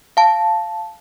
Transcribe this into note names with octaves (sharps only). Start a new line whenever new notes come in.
F5 A5